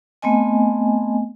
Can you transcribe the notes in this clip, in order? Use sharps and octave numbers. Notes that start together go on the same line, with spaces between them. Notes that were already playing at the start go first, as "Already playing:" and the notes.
A3 B3 C4 D#5 G#5